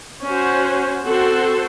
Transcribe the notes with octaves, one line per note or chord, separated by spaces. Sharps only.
C#4 F#4 C5
C4 F#4 A4 C5